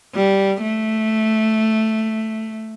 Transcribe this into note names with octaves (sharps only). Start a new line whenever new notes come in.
G3
A3